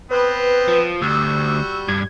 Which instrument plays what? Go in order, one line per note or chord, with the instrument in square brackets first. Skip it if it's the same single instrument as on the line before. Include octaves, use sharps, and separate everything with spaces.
[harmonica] B3 C4 [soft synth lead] B4
[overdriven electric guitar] F3
[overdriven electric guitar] D2 [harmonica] G3 F#4 [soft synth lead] E6
[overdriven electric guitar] G2 [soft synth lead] G#6